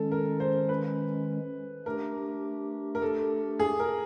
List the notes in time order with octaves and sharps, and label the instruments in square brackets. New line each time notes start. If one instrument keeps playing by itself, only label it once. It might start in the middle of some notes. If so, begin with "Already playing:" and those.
Already playing: [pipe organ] D#3 G#3 C#4 [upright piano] A4
[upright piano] A#4
C5
B4
[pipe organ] A3 D4 G4 [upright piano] A#4
[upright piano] A#4
A4
G#4
A#4